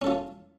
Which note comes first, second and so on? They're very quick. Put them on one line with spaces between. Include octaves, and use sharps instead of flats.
C#4 A4 F4